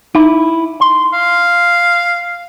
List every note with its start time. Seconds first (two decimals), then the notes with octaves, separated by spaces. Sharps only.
0.15 D#4 E4
0.81 C6
1.13 F5